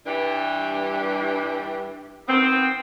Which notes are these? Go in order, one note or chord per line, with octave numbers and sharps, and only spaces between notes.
G2 E3 G3 D4
D#3 B3 C4